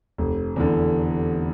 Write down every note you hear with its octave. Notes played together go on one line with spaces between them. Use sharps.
F1
E2 D3